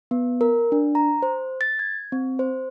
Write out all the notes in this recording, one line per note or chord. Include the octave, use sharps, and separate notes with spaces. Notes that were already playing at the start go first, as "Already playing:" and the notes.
B3
A#4
D4
A#5
C5
A6
G#6
C4
C5